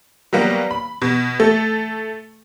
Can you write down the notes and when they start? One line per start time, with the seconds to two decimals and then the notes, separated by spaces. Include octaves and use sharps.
0.33 F#3 G3 A#3 B3
0.71 B5
1.02 B2
1.40 A3 A4